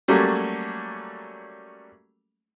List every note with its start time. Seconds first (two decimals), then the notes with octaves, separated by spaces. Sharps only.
0.08 F#3 G3 A3 A#3 C#4